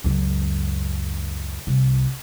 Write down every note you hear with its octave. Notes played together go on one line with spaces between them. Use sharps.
C#2 F#2
C2